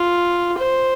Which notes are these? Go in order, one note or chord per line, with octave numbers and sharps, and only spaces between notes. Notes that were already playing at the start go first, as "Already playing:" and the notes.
Already playing: F4
C5